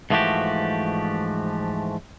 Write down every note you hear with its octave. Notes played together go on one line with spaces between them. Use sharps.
G#2 E3 F3 A3 F#4 G4